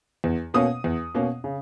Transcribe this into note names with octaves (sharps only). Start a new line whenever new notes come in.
E2
B2 A#3 C#4 D#6
E2
B2 A#3 C#4
C#3